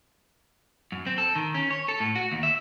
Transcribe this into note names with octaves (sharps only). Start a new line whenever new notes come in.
F#2
C4
A4
D#3
C#4
C#5
A4
A2
F#4
D#2
E5